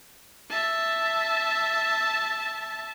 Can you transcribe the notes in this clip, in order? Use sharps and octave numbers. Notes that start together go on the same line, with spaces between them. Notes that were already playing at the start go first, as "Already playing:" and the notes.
E5 A5